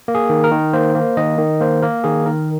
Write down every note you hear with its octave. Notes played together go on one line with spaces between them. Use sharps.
A#3
G#4
D#3
A#4
D#3
A#3 C5
A#3
D#3 D#5
D#3
A#3 C5
A#3 A#4
D#3 G#4
D#3 A#4